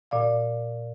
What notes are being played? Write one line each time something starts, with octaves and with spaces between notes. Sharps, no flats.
A#2 D5 F5